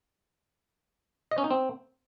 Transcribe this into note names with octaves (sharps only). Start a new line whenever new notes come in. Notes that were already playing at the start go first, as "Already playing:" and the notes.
D#5
C#4
D#4
C4